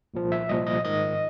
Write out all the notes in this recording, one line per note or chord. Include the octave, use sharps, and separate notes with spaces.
C2 A#2 F3
E5
C2 A#2 F3 D#5
D#5
G#2 D#3 D#5